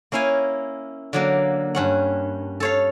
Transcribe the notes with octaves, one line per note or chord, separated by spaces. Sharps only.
A#3 C#4 E4 F5 G#5
D3 F#3 A#3
G2 C#4 F#5
A4 C#5 F5